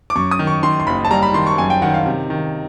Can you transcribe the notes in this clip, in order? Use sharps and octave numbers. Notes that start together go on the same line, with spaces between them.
D6
F#2 C#6
D#6
D#3
C#6
D#3 C6
C6
F#1 B5
A5
G3 A#5
B5
D#3 C6
C#6
F#2 G#5
G5
D#3 F#5
F5
C3
D#3